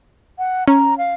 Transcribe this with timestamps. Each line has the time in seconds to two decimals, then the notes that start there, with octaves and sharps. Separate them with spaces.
0.39 F#5
0.68 C#4 A#5
0.98 F5